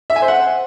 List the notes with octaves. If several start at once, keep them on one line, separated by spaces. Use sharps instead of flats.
E5
G#5
C5
F#5